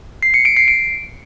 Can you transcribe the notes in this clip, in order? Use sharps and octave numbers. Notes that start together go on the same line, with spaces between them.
C7
C#7
D7
C7
D7